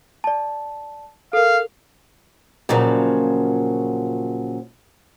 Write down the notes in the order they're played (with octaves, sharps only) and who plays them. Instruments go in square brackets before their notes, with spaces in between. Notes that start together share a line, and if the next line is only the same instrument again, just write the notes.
[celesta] D5 A5
[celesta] A4 A#4 [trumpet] F5
[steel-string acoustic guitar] A#2 C#3 F3 F#3